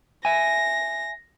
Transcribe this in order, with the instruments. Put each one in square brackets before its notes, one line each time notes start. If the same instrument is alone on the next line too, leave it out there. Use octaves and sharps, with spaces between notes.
[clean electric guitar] E5 G#5 [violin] A#6